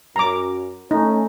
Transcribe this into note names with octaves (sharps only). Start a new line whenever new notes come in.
F#2 A#5 D6
A3 C#4 D#4